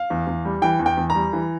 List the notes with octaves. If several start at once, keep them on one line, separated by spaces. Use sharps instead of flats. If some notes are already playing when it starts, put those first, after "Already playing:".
Already playing: F5
E2
E2
G3
E3 G5
E2
G5
E2
A#5
G3
E3